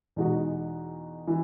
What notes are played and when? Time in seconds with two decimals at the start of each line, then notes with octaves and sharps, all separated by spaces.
0.16 E2 B2 G#3 D#4 F#4
1.27 E3